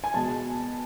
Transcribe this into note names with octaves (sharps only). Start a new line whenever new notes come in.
G#5
B2 G#3 A5